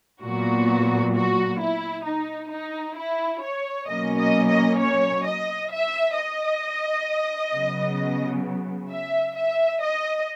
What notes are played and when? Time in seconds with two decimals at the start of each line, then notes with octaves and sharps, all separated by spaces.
0.22 A#2 F#3 B3 F#4
1.14 F#4
1.60 E4
2.05 D#4
2.51 D#4
2.97 E4
3.42 C#5
3.88 B2 F#3 A#3 C#4 D#5
4.19 D#5
4.49 D#5
4.79 C#5
5.25 D#5
5.71 E5
6.17 D#5
7.53 C#3 F#3 B3
8.91 E5
9.36 E5
9.82 D#5